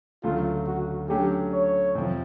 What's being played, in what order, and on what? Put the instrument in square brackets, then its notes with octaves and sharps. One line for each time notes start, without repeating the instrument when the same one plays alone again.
[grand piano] D2 C#3 F#3 A3 [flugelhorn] F4
[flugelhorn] F#4
[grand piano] D3 F#3 A3 C#4 [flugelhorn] G4
[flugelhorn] C#5
[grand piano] F2 C3 F3